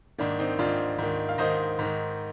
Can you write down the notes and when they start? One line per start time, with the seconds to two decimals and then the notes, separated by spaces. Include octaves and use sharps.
0.18 G#2 D#3 A#3 D4
0.39 C4 D#4
0.59 G#2 D#3 D4 F4
0.98 G#2 D#3
1.29 F5
1.38 G#2 D#3 C5 D#5
1.79 G#2 D#3